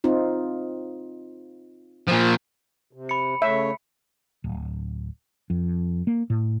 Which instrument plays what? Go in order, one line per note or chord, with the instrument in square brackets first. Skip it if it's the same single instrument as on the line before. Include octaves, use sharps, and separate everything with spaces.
[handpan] C4 D#4 F4
[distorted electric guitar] A#2 F3
[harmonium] C3
[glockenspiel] B5 C#7
[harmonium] C#3 A3 C#5 [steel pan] E5
[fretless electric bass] D1
F2
A#3
A2